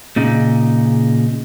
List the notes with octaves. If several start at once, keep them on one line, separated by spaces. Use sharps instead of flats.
A#2 C#3 D#4